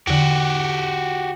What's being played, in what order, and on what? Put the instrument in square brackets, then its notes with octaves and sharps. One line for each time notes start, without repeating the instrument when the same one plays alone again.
[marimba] E2 D3 [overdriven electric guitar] F#4 G4